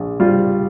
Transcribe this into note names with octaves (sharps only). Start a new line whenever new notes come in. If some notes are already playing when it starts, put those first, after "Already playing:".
Already playing: A#1
G3 F4